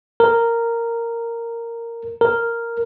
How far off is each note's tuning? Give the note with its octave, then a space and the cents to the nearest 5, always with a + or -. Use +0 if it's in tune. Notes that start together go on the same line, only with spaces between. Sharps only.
A#4 -10
A#4 -5